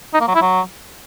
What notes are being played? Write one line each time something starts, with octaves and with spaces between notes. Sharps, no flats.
D#4
A#3
F#3
E4
F#3